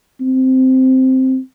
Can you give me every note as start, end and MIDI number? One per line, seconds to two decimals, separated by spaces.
0.21 1.38 60